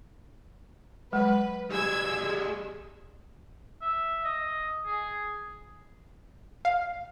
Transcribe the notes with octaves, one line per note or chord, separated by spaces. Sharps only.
F#3 G#3 B4
G3 G#4 E6 G#6
E5
D#5
G#4
F5